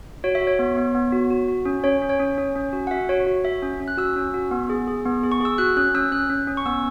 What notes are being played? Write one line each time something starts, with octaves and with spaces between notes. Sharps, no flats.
F#4 C#5
E5
F#4
C#5
B3
B3
B3
F#4
F#4
F#4
C#4
C#4 C#5
C#4
C#5
C#4
C#4
C#4
F#4
F#5
F#4 E5
F#4 C#5
F#4
F#4 E5
C#4
C#4
F#6
F#4 E6
C#4
F#4
B3
G#4
G#4
B3
G#4
C#6
G#4 E6
F#4 F#6
C#4 F#6
C#4 E6
C#4 F#6
C#4
C#4
C#6
B3 E6